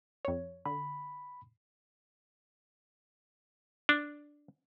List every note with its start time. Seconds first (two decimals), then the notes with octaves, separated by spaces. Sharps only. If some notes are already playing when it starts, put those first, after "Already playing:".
0.25 F2 C#5
0.66 D3 B5
3.89 D4